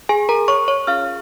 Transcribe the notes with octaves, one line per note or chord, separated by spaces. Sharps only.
G#4 G#5
A#4 A#5
C#5 C#6
C#5 C#6
C#4 F4 G#4 F5 F6